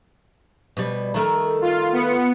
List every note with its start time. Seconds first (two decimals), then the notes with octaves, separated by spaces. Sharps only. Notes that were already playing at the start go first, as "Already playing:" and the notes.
0.77 B2 G3
1.14 D#3 A3 A#4
1.62 F4
1.93 B3 C#7